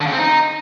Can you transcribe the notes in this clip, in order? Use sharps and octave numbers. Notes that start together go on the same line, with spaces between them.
D3
C#3
C4
D#4